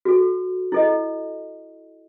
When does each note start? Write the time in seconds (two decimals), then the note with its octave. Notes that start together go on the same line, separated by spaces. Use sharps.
0.05 F#4 A4
0.72 E4 A4 D#5